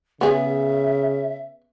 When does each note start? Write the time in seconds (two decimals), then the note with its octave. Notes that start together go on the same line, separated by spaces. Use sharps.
0.21 C#3 B3 G#4 E5